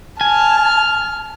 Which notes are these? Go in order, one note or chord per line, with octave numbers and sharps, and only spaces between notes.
G#5 A5 F6